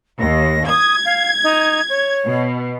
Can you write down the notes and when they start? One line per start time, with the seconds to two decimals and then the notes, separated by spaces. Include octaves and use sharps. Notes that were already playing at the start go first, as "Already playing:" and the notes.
0.19 D#2 A#6
0.68 D#6 G#6
1.05 F5
1.43 D#4
1.89 C#5
2.27 B2